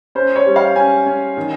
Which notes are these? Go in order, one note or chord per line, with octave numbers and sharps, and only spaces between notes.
C#4 C5
C#5
G3
F5
C#4 G#5
C#4
D#3